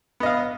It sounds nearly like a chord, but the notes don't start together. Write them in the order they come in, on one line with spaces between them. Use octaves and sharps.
B3 D#5 F5